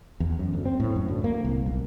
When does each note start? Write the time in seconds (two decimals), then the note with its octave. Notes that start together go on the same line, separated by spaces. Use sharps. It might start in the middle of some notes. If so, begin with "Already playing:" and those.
0.20 E2
0.39 F#2
0.54 D2
0.65 C4
0.80 A2
0.96 F#2
1.08 D2
1.24 A#3
1.44 C2
1.66 B1